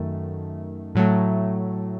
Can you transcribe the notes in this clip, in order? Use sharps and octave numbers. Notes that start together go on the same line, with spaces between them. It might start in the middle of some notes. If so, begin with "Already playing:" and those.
Already playing: F#2 D#3 A3
A2 F#3 A3